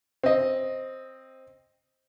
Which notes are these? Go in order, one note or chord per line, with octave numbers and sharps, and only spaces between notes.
C4 D#5